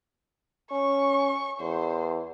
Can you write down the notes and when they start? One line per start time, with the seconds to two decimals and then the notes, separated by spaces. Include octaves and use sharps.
0.71 C#4 C#6
1.60 E2 C5